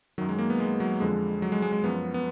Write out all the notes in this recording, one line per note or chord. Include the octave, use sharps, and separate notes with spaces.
F#2 D#3 F#3
G#3
A#3
B3
G#3
F#3
F2 D3 F3 G#3
F#3
G#3
G#3
G#3
F#2 F3 B3
B3